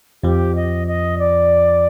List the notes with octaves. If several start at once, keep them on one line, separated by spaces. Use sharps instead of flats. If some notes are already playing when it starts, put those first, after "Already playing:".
F2 F3 G4
D#5
D#5
D5